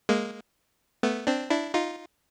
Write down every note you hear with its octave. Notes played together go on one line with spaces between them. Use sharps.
G#3 A#3
A3 B3
C4 D4
D4 E4
D#4 F4